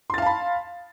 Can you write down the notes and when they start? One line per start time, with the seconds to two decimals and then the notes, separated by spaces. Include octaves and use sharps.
0.10 C6
0.14 A6
0.18 F5
0.22 A5
0.26 B5